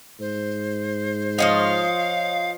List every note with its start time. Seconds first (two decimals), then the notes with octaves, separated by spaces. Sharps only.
0.20 G#2 C5
1.39 F3 C#5 D#5 F5